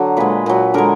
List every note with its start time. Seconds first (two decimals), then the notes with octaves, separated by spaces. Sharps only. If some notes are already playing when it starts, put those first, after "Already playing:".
Already playing: D3 F#3
0.17 A#2 G#3 B4
0.46 A#2 F#3
0.74 D3 G#3 A#4